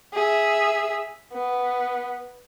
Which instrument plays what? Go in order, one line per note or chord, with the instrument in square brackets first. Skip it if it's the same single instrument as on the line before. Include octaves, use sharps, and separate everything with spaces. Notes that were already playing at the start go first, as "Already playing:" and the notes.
[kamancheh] G#4 E5
B3